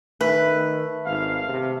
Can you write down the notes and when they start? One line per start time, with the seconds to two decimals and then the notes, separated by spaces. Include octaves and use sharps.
0.21 D#3 A3 B4
1.06 G#1 F5
1.49 C3